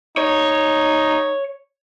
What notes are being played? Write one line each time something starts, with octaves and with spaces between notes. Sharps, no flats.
D#4 C#5